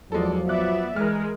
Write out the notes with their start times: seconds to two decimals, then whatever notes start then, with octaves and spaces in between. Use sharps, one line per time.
0.12 E2 F3 F#3 G#3 A4 D5
0.49 B3 D5 E5 D6 F#6
0.96 E3 G#3 A#4 F6